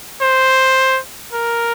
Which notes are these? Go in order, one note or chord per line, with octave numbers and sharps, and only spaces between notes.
C5
A#4